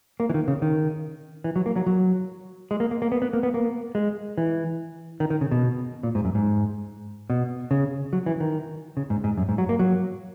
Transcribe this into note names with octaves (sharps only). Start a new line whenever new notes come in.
A#3
E3
D#3
C#3
D#3
E3
F#3
A#3
F#3
F#3
G#3
A#3
A#3
A#3
B3
B3
A#3
B3
A#3
G#3
E3
D#3
D#3
C#3
B2
A#2
G#2
F#2
G#2
B2
C#3
F#3
E3
D#3
C#3
G#2
G#2
F#2
G#2
F#3
A#3
F#3